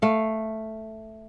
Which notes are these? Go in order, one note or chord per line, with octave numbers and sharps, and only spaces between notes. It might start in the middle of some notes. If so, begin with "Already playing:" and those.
A3 F5